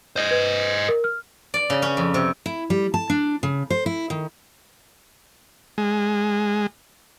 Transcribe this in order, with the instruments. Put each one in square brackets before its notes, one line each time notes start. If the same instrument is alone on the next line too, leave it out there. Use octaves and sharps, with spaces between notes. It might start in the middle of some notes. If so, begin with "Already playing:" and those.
[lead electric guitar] C5 D#5
[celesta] B4 G#6
A#4
F6
[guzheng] D5
C#3
C#4
F2
C3
[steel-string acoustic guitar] E4
G3
A5
D4
C#3
C5
E4
D#3
[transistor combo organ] G#3